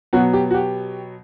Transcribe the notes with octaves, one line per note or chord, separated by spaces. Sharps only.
B2 F#3 B3 F#4
G4
F#4
G4